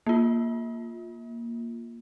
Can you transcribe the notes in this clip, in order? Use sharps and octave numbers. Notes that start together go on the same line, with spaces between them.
A#3 F4